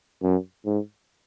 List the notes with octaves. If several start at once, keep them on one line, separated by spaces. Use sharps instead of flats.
F#2
G#2